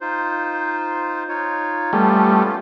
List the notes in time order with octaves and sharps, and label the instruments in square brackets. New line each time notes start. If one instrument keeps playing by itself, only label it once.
[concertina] D#4 F4 C5
D#4 F4 C#5
[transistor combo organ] G3 A3 [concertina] B3 C#4 F4